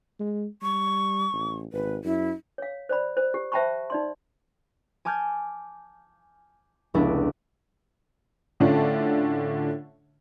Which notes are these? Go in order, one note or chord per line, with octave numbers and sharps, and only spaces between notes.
G#3
G3 C#6
A1
G#1 B4
F#2 E4
C#5 F5
C5 D5 B5
C5
G4
C5 E5 G5 A5 B5 C#6
D#4 D5 C6
G#5 A5 D6 F6 G6 G#6
F1 C#2 B3 D4 E4 D6
A2 D3 A3 C#4 D4 F4